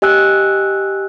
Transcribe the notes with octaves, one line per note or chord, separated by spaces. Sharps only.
G4 D#5 G#5 E6 F#6